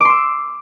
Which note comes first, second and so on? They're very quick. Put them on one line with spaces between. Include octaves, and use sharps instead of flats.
D6 C6 E6